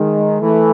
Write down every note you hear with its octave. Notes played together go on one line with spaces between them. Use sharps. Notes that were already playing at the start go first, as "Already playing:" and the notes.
Already playing: D#3 G#3
E3 A3